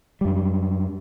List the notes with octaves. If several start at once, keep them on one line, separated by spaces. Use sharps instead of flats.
F#2 G3